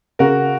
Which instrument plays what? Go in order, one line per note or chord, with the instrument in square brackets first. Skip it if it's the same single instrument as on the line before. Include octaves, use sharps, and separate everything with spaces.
[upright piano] C#3 [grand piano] F#4 A#4